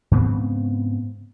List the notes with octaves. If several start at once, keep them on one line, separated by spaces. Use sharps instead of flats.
G#2 C#3 B3 C4